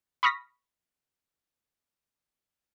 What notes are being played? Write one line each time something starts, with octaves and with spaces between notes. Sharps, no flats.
B5 C#6 D#6 F6 A#6 B6